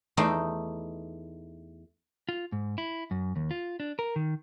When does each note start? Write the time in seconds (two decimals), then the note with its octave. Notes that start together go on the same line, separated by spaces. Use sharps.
0.17 E2 A3 D#4 G5 C6
2.29 F4
2.52 G#2
2.78 E4
3.11 F#2
3.36 D#2
3.51 F4
3.80 D4
3.99 A#4
4.16 D#3